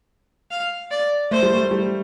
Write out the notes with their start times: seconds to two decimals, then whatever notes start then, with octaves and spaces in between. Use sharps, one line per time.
0.51 F5
0.91 D5
1.31 A3 C5
1.43 G3
1.54 A3
1.71 G3